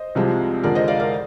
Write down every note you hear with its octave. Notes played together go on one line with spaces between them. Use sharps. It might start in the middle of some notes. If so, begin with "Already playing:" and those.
Already playing: C5 D#5
C2 C3 F3 G#3
F2 D3 G#3 A#4 D5
C5 D#5
D5 F5
A#4 D5